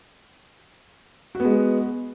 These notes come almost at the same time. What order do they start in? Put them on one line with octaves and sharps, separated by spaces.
F#4 B3 G#3